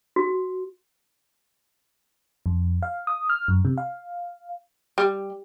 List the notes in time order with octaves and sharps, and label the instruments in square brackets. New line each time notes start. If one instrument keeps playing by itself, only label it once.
[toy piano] F#4
[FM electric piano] F2
F5
D#6
F6
F#2
C3
F5
[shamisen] G3